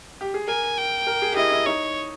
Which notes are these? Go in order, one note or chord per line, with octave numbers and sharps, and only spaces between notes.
G4
G#4
A#4 G#5
G5
A#4
G#4
G4
E4 D#5
E4
D#4 C#5